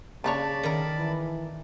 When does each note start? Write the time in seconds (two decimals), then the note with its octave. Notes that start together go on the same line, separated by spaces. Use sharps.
0.24 C#3 A#3 D4 C#5 D5 A5 B5
0.63 D#3 E4 A#4
0.97 E3